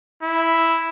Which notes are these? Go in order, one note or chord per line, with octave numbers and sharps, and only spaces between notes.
E4